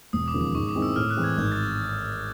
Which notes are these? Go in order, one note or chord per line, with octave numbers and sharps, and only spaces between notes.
E1 D#6
D6
D#2 C#3 F3
D6
G#2 C#6
D6
D#3 G#3 C4 E4
E6
A2 F6
F#6
E3 G#3 C4 E4
G#6
G#1 G6
A6